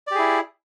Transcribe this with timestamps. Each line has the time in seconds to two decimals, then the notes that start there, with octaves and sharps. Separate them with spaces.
0.07 D5
0.11 G4
0.15 G#4
0.19 E4